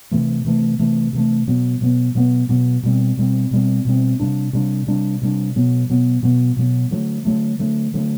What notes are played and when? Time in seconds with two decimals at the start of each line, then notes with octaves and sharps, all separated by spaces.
0.11 C3 E3 A3
0.45 C3 E3 A3
0.79 C3 E3 A3
1.13 C3 E3 A3
1.47 B2 F#3 B3
1.81 B2 F#3 B3
2.15 B2 F#3 B3
2.49 B2 F#3 B3
2.83 B2 G3 C4
3.17 B2 G3 C4
3.51 B2 G3 C4
3.85 B2 G3 C4
4.20 C3 G3 D4
4.53 C3 G3 D4
4.87 C3 G3 D4
5.21 C3 G3 D4
5.56 B2 F#3 B3
5.89 B2 F#3 B3
6.23 B2 F#3 B3
6.56 B2 F#3 B3
6.91 D3 F#3 A3
7.25 D3 F#3 A3
7.59 D3 F#3 A3
7.94 D3 F#3 A3